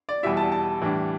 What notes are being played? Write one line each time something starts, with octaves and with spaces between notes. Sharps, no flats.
D5
E2 B2 G3 E4 E5
A5
A5
A2 E3 G3 D4